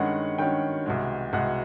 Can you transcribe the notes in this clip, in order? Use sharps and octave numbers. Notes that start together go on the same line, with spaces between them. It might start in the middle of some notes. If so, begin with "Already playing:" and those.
Already playing: G2 D#3 G#3 C#4 F#5
G2 D#3 G#3 C#4 G5
C2 B2 G#3
C2 B2 G#3 F#5